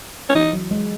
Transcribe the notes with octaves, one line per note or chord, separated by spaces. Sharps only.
C#4
E3 D#4
F#3
G#3